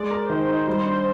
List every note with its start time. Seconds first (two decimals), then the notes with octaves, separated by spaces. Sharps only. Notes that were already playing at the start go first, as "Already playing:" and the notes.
Already playing: G#3 D5
0.11 A#4
0.30 D#3 C5
0.48 D#4
0.67 G3
0.86 D4